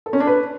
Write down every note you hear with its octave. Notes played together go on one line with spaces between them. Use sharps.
A4
C#4
D4
B4